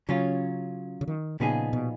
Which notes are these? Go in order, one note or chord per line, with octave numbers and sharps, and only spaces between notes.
C#3 F#3 C#4 F4
C#3
D#3
A#2 C#3 F3 B3 D#4 G#4
B2